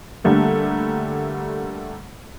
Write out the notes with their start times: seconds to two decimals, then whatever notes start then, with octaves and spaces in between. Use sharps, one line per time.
0.24 D3 G3 A3 A#3